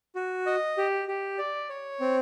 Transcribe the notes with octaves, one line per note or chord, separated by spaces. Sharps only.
F#4
D#5
G4
G4
D5
C#5
C4